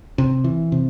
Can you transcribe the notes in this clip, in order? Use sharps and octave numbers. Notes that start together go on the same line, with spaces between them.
C3
E3
C3